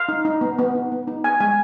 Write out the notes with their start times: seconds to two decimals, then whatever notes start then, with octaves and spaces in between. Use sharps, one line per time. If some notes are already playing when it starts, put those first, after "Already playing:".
Already playing: F5
0.09 D#4
0.25 D#4
0.41 B3
0.58 B3
0.75 D#4
0.92 B3
1.07 D#4
1.24 B3 G#5
1.40 G#3 G#5